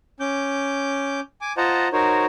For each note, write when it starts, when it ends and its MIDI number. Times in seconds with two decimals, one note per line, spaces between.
0.20 1.20 61
0.20 1.20 86
0.20 1.20 91
1.41 1.53 80
1.41 1.53 86
1.57 1.88 65
1.57 1.88 72
1.57 1.88 75
1.57 1.88 78
1.57 1.88 81
1.57 1.88 82
1.93 2.26 63
1.93 2.26 66
1.93 2.26 70
1.93 2.26 72
1.93 2.26 73